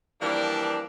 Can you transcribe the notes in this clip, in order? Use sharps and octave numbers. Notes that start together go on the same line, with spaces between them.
E3 F3 G3 A#3 D4